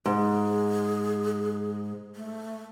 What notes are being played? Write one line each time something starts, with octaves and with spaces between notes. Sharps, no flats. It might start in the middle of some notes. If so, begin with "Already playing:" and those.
G#2 G#4
A3